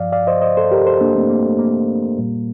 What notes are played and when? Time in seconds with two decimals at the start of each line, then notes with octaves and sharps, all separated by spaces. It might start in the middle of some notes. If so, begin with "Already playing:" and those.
Already playing: G2 F3 D5 F5
0.12 D5 F5
0.27 C5 D#5
0.41 C5 D#5
0.57 A4 C5
0.71 G4 A#4
0.86 A4 C5
1.00 A#3 D4
1.15 A3 C4
1.30 A#3
1.45 A3
1.59 A#3
2.18 A#2 G3